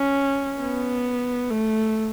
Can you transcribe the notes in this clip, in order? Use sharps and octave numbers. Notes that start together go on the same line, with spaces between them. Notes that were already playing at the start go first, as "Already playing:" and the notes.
Already playing: C#4
B3
A3